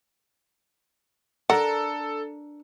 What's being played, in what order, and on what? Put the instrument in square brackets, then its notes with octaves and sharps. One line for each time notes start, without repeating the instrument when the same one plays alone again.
[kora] D4 A#4 [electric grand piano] A4 [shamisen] F#5